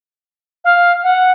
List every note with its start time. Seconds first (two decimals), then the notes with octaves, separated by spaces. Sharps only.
0.64 F5
1.03 F#5